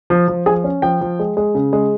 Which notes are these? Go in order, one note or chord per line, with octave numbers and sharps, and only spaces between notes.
F3
F3
F3 G#4 G#5
C#4
F3 G5
F3
G#3
G#3
C#3
G#3